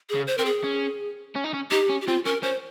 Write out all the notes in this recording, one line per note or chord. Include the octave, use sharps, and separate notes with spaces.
G#4
C#3
C5
C4 A#4
G#4
C#4
C#4
D#4
C#4
D#4 G4
C#4
G4
C4 F4
C#4 A#4
C#4 C5